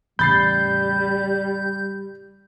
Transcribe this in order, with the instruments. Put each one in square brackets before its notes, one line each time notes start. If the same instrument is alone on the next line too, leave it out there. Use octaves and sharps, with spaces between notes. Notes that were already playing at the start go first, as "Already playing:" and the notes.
[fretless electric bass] E2 A2 C#3 [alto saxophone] G3 [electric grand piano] B5 A6 C7 [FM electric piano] G6